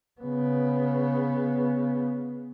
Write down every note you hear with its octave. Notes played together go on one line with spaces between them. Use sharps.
C#3 B3